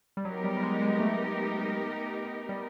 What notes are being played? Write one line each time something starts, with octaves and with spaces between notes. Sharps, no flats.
G3
F#3 B3 D#4 G4 A#4
G3
G3
G#3
G#3
A3
G3